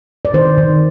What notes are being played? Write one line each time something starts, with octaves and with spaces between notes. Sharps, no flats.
D5
D#3 C5
D#3